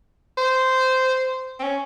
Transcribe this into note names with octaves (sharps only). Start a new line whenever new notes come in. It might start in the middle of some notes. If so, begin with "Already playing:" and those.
C5
C4
C#4